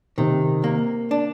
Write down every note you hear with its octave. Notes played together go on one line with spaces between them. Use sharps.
C3 D#3
A#3
D4